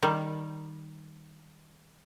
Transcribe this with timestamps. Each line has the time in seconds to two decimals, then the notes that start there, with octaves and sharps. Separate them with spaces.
0.02 D#3 G3